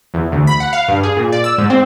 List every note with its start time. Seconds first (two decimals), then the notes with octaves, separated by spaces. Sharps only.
0.14 E2
0.32 D2
0.47 B5
0.60 F#5
0.73 F5
0.88 G2
1.03 G#4
1.17 A#2
1.32 D5
1.44 E6
1.58 G#2
1.70 C4